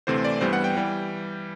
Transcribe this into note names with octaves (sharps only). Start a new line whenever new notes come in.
D2 C3 E3 A3 C4 C5
D5
G2 E3 G3 B3 C5
F#5
G5
E3 G3